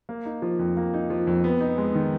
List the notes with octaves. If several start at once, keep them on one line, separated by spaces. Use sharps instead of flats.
A#3
D#4
F3
F2
A#3
D#4
F3
F2
B3
D#4
G#3
D#3